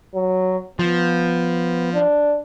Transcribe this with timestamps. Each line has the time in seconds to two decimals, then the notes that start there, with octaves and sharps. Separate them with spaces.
0.15 F#3
0.79 F3 B3
1.94 D4